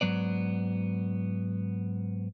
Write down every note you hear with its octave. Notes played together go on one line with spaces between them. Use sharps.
G#2 F#3 B3 D5